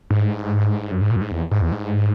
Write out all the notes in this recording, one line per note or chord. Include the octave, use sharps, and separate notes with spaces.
G#2
F#2
G#2
A#2
F#2
G#2
E2
G#2
E2
G#2